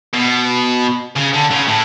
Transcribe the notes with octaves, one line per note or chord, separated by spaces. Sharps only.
B2
C#3
D3
C#3
A2